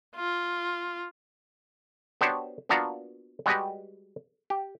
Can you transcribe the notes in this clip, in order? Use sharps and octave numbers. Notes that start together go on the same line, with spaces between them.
F4
B3 D4 F#4 G4 C5 C#5
A#3 B3 D4 F4 F#4 A#5
G3 G#3 F#4 G4 B4 D#5
G4